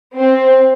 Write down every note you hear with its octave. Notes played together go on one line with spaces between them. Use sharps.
C4